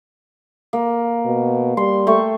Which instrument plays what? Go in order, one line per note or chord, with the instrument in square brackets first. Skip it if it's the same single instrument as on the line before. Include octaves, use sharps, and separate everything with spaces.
[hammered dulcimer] A#3
[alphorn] B2
[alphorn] G3 [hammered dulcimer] C6
[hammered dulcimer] A3 G5 C#6